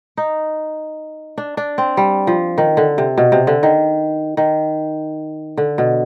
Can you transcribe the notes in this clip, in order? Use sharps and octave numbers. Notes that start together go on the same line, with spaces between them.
D#4
D4
D4
C4
G3
F3
D#3
D3
C3
B2
C3
D3
D#3
D#3
D3
B2